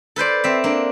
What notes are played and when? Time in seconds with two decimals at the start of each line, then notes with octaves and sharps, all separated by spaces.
0.16 A4 B4 C5 D5
0.44 C4 E5
0.64 A#3 D4